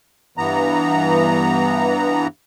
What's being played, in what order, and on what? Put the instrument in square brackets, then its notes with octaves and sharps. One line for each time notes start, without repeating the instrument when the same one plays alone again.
[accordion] G2 E3 B3 A#5